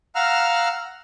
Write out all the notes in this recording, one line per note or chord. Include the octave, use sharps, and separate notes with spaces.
F5 F#5 A#5 E6 F6